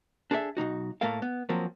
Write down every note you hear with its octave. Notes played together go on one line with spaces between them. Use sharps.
D4 G#4 A4 C#5 E5
B1 C3 D#4 F#4
A2 A3 A#3 A4 A#4 F5
B3
F3 F#3 A#3 C4